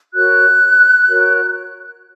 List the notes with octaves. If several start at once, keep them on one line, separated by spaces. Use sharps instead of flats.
F#4 A#4 C#5 F#6
F#4 A#4 C#5